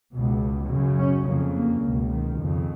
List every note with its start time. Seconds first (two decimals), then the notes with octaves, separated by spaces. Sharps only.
0.15 C#2 B2
0.71 F#2 C#3
0.99 C#4
1.27 F2 C#3 A#3
1.56 A#3
1.84 C#2 B2
2.12 D#3
2.40 F2 C#3